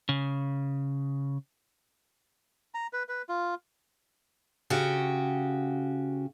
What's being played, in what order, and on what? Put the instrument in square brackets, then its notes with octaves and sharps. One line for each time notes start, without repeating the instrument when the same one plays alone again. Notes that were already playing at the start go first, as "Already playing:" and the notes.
[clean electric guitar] C#3
[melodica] A#5
B4
B4
F4
[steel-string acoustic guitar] C#3 F#4 G4